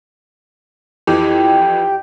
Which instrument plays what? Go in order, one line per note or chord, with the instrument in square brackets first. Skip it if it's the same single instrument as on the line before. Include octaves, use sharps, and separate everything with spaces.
[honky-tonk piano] F2 E3 [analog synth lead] G4